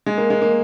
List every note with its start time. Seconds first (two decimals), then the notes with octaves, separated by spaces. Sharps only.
0.06 G#3
0.18 A#3
0.30 G#3
0.42 A#3